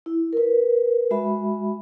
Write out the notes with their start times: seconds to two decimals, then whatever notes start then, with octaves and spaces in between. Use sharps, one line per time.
0.06 E4
0.33 A#4 B4
1.11 G#3 F#4 E5 B5